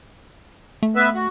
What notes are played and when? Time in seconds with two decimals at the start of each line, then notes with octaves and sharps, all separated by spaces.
0.83 A3
0.96 B3 B4 E5
1.14 F#4